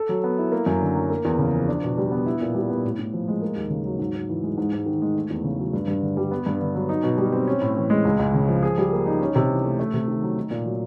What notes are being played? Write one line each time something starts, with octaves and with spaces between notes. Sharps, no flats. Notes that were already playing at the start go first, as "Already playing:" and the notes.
Already playing: A4
F#3
B3
E4
A#3
F#2
D3
F#3
A#3
E2
C#3
F3
D4
B2
G3
B3
E4
A#2
G3
B3
A2
A2
F3
G#3
A#3
D#2
C#3
F#3
G#2
G#2
E3
G#3
G#2
G#2
D#3
G#3
A3
E2
C#3
F#3
G2
G2
D3
G3
B3
G2
D3
F#3
D#4
B2
G3
C4
C#4
A2
E3
G#3
C#2
C#2
C#3
F3
G#4
G3
A#3
D#4
C#4
C3
E3
A3
A3
C3
D#3
F#3
D#4
A#2
F#3